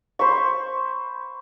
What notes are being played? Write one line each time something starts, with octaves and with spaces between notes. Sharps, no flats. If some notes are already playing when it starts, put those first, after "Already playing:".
C5 B5 C#6